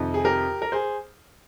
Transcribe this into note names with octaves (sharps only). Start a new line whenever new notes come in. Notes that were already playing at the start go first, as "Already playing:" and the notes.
Already playing: F2 C3 D#3
G#4
G4 A#4
A#4
G#4 C5